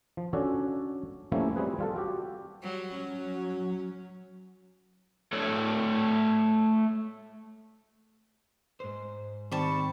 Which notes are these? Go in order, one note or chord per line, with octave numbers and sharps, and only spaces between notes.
F3
C#4 D4 F#4 A4 C#5
F3 G3 A3 A#3 C#4 E4
G3 C4 G#4 B4
G3 F4 A4
F#4 G4
F#3 G3
F#3 C#4
A3 A4 C#5 D5
G#2 C5
D#3 G3 C4 A5 C#6